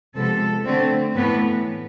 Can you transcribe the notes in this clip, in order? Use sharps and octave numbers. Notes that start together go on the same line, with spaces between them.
C3 F3 G#3 B3 A4
D3 A3 C4
A2 E3 B3 B4